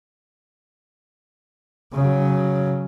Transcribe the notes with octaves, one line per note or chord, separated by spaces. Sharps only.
C#3 F#3